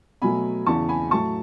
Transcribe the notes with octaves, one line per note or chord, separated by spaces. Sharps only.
B2 F#3 A3 G#5 B5
E2 C#3 E3 A5 C#6
G#5 B5
A2 F#3 A3 A5 C#6